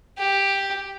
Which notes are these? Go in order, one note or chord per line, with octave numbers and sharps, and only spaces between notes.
G4